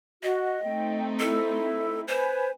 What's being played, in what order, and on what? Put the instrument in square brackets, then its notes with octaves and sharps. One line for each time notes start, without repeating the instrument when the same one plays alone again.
[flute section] F#4 [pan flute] D#5
[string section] A3 C4 D#4 [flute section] G5
[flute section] E4 [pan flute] A4
[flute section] B4 G#5 [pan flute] C5